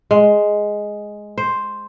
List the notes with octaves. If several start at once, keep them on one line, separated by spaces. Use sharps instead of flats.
G#3
C5